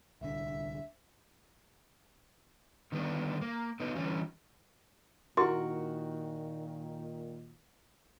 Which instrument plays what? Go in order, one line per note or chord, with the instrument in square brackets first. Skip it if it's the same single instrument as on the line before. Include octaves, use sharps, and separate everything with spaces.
[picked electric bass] D1 C2 D3 [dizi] E5
[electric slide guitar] D3 D#3 G3 B3 D4
A#3
D3 B3 D#4
D3 E3 G3 C#4
[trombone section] A#2 D#3 [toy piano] E4 G4 [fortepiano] F#4 A#4 C#6 [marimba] C6